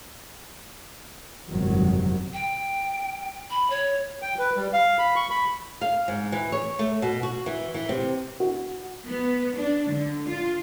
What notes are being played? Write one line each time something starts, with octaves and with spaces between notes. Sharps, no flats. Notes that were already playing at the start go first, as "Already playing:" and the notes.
G1 F2 G#2 C3 D#3 F#3
G5
B5
C#5
G5
B4
G3
F5
B5
C#6
B5
F5
G#2
E3
C#5
A3
B2
F#4
E3
E3
C3
F#4
B3
D4
D3
F4